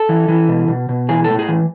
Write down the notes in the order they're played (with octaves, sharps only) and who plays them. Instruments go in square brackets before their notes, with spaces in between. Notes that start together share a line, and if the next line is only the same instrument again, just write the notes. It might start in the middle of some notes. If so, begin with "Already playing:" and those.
Already playing: [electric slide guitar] A4
E3
E3
B2
B2
B2
E3 G#4
A2 A4
G#4
E3